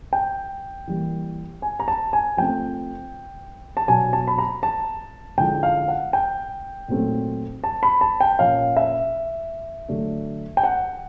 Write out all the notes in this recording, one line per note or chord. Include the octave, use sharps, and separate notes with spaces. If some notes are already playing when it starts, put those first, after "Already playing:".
G5
E3 G3 A#3
G#5
A#5
A5
G#5
F3 A3 C4 G5
A5
B2 F#3 B3 D4 G#5
A5
B5
A#5
A5
D3 F3 G#3 C#4 E4 G5
F5
F#5
G5
A#2 F#3 A3 C4 D#4
A5
B5
A5
G5
A#2 F3 A#3 C#4 F5
E5
D3 F#3 A3 D4
G5
F#5